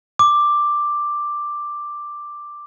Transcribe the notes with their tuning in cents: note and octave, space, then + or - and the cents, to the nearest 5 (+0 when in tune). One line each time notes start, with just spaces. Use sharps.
D6 +5